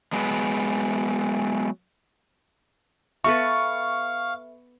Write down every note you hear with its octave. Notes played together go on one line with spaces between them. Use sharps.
F#3 G#3 B3
B3 A4 B4 E5 F5 C#6